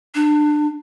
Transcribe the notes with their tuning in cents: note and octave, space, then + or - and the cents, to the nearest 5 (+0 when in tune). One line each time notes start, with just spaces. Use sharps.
D4 +25